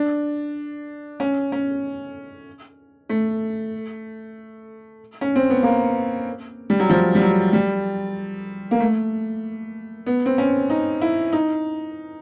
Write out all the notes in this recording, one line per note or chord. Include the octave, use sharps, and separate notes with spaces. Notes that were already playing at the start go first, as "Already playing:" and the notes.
Already playing: D4
C#4
C#4
A3
C#4
C4
B3
A#3
G3
F#3
F3
G3
F#3
G3
A#3
A3
B3
C4
C#4
D#4
E4
D#4